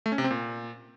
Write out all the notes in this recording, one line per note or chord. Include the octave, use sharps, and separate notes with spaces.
A3
C#4
C3
C4
A#2